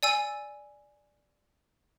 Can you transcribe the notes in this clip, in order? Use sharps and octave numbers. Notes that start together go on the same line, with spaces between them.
D5 G#5 E6